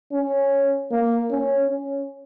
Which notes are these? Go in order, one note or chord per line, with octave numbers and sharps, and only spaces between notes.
C#4
A#3
C#4
C#4